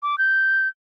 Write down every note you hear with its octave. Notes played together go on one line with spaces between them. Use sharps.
D6
G6